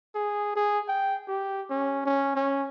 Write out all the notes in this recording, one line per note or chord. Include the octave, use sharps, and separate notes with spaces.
G#4
G#4
G5
G4
C#4
C#4
C#4